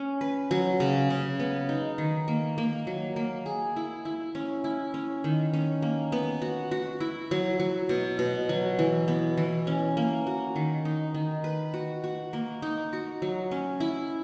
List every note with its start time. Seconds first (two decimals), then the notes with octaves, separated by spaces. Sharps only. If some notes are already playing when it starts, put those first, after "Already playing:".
Already playing: C#4
0.21 B4
0.51 F#3
0.80 C#3
1.10 C#3
1.40 B3
1.69 D#4
1.98 D#3
2.28 A#3
2.58 A#3
2.87 F#3
3.16 A#3
3.46 G#4
3.76 E4
4.05 E4
4.35 C#4
4.64 E4
4.94 C#4
5.24 D#3
5.54 C#4
5.82 A#3
6.12 B3
6.42 F#4
6.71 F#4
7.00 E4
7.31 F#3
7.60 F#3
7.89 B2
8.19 B2
8.49 F#3
8.79 E3
9.08 B3
9.37 E3
9.67 C#4
9.97 A#3
10.27 F#4
10.56 D#3
10.85 D#4
11.14 D#3
11.44 B4
11.74 F#4
12.04 F#4
12.33 A#3
12.62 D#4
12.93 F#4
13.22 F#3
13.51 C#4
13.80 E4